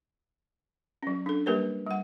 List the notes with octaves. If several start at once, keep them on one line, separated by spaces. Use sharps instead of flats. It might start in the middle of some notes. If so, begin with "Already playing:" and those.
F#3 C#4
D4 A4
G3 A#3 G4 A#4 B4 C#5
G3 F#5